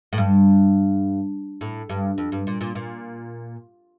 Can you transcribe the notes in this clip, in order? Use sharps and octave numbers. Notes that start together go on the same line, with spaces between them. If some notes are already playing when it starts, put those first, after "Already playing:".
A2
G2
A2
G2
F2
G2
A#2
A#2
A#2